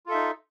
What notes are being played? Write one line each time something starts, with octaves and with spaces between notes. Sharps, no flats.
D#4 F4 A4 E5